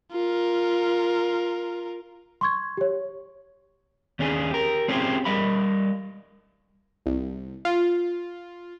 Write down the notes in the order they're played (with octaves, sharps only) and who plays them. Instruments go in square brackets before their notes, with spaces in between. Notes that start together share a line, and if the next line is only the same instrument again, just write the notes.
[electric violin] F4 A#4
[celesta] C6 C#6 G#6
G4 C#5
[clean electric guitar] D#2 C#4 D4 G#4
G4 A#4
C4 C#4 F4 G4 G#4 C5
G3 A#4 D#5 F5 B5
[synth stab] C2
F4